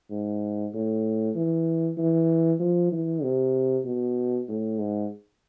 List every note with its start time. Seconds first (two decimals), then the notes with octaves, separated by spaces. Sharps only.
0.10 G#2
0.74 A2
1.35 E3
1.98 E3
2.60 F3
2.92 E3
3.23 C3
3.85 B2
4.48 A2
4.79 G#2